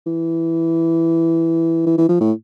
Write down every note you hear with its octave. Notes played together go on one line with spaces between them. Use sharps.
E3
E3
E3
F3
A2